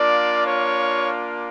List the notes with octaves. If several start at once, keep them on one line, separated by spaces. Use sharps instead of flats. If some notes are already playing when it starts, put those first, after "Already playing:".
Already playing: A#3 D4 F4 D5
C#5